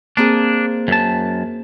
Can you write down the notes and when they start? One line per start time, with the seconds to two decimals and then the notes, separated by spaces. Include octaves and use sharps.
0.17 A#3 C4 D4 G#4
0.88 F#2 A5